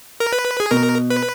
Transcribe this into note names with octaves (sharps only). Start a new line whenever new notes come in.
A#4
B4
G#4
B2 A#4
B4